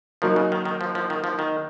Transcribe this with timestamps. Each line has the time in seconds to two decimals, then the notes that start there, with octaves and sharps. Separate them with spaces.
0.22 F3 F#3 A#3 D#4 F#4 A#4
0.36 C#3
0.52 D#3
0.65 D#3
0.81 F3
0.95 F3
1.10 D#3
1.24 F3
1.39 D#3